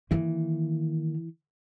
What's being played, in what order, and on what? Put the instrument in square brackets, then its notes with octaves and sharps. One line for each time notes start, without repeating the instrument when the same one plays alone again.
[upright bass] D#3 A#3 [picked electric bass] E3